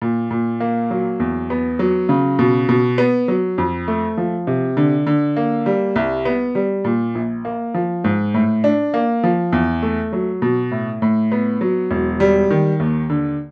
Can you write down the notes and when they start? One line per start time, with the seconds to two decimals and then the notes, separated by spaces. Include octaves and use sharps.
0.02 A#2
0.31 A#2
0.60 A#3
0.91 F#3
1.20 E2
1.50 B3
1.79 F#3
2.09 C#3
2.39 B2
2.69 B2
2.98 B3
3.28 F#3
3.58 F2
3.88 A3
4.18 F3
4.47 C3
4.77 D3
5.07 D3
5.36 A#3
5.66 G3
5.96 C2
6.25 B3
6.55 G3
6.85 A#2
7.15 A#1
7.45 A#3
7.74 F3
8.04 G#2
8.34 A2
8.64 D4
8.94 A#3
9.24 F3
9.53 E2
9.82 A3
10.13 F#3
10.42 B2
10.71 A2
11.02 A2
11.32 B3
11.61 F#3
11.91 E1
12.20 G3
12.50 D#3
12.80 D#2
13.10 D3